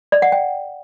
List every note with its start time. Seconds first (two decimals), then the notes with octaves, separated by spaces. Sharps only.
0.12 D5
0.22 F#5
0.32 G5